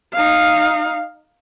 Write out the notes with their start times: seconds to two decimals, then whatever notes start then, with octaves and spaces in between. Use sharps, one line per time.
0.13 D#4 F5